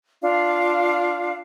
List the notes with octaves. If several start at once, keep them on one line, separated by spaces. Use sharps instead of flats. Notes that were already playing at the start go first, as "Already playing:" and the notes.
D4 F4 F5